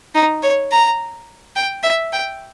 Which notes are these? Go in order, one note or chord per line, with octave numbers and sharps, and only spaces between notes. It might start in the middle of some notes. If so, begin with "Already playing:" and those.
D#4
C#5
A#5
G5
E5
G5